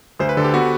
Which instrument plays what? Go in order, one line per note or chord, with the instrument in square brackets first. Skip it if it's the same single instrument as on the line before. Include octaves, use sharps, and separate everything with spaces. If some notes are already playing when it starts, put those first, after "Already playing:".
[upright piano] D2 [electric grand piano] C5
[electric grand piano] B4
[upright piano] D3 [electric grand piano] A4
[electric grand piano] G4
[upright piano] B3 [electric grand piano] F#4